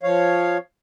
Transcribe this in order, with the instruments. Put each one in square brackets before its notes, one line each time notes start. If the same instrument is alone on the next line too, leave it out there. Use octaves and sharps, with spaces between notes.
[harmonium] F3 C#5 F5